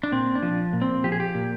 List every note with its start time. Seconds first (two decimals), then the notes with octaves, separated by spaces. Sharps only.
0.03 D4
0.12 A#2 C4
0.35 D4
0.42 F3
0.73 A#2
0.82 C4
1.04 F3 G4
1.12 G#4
1.20 G4
1.35 A#2